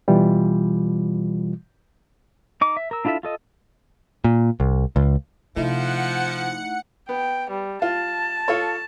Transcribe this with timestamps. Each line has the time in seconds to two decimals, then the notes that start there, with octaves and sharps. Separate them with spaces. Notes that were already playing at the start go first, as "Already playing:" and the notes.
0.08 B2 E3 G3 F4
2.61 D#4 D6
2.77 E5
2.91 A#4 E6
3.05 D4 E4 F4 A4 E5
3.23 F4 A4 D#5
4.24 A#2
4.60 C2
4.96 C#2
5.56 C3 F3 A3 D#4 E4 F#5 C#7
7.09 B3 G5
7.50 G3
7.82 F4 A5
8.48 F4 A4 C#5